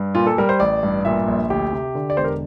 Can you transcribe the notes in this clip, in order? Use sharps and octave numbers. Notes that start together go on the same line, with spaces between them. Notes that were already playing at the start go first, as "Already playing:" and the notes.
Already playing: G2
A#2 F4
A4
G3 A#4
C5
A1 D5
G2
A#2 E5
A#1
D2 G4
C3
D3
D5
E1 C5
A#4